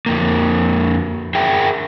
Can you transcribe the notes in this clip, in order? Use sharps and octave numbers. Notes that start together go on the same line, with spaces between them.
F2 A#3
G#4 A#4 E5 G5